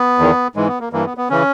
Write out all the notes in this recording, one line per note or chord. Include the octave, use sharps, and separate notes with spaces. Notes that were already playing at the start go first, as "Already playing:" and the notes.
Already playing: B3
E2 D#3
G#2 E3 G#3
B3
A#3
G2 E3 A#3
B3
B3
C#3 E3 C#4